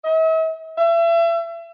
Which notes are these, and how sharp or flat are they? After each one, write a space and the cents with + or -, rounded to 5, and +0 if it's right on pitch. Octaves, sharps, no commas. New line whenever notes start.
E5 -45
E5 +35